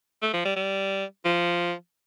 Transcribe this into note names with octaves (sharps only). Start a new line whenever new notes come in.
A3
F3
G3
G3
F3